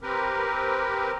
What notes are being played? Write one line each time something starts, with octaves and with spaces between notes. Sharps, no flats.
C4 G4 A#4 B4